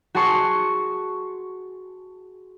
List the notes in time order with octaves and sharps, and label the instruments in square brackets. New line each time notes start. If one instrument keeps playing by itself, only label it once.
[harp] F#4 G#4 A5 C6 C#6